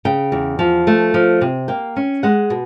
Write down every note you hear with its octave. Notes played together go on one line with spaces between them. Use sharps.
C#3 G5
E2
F3
A3
F3
C3
A#3 G5
C#4
G#3 F#5
B2